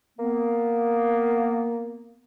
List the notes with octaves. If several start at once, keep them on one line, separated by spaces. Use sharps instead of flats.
A#3 B3